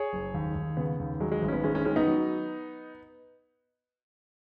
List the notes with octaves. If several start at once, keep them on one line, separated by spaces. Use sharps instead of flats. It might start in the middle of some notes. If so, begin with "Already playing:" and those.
Already playing: G#4 C#5
F#1
D#2
D#2
C#3 B3
D#2
F#3 G#3
G#3
G#1
C#4
B3
G#1 G#3 C#4
G#3 C#4
D#3 G#3 C#4
B3 D#4
F#3